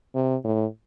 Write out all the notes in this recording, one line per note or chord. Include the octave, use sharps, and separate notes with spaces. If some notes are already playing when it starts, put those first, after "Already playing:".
C3
A2